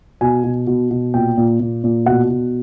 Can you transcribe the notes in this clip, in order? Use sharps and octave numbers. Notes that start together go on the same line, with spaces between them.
B2 G#5
B2
B2
B2
A#2 G5
A#2
A#2
A#2
B2 F#5
B2